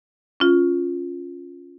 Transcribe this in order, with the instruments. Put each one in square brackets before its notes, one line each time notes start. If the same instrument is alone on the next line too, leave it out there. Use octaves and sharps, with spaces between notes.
[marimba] C#4 F4